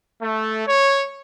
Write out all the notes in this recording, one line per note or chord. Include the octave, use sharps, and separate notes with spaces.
A3
C#5